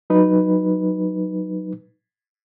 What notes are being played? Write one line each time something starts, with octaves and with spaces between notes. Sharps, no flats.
F#3 D#4 B4